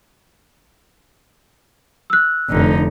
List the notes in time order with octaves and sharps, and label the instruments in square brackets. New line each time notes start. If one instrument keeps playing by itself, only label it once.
[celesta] E6 F#6
[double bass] F1 [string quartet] D3 D#4